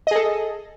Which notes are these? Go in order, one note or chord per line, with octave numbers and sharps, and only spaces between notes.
G#4 A4 D#5